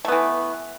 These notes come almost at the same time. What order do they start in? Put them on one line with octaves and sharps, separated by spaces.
A3 B3 E3